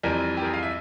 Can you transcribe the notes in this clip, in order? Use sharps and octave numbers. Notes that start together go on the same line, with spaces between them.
F2 C3 E3 G3 A#4
G4
A#4
G#4
F5
E5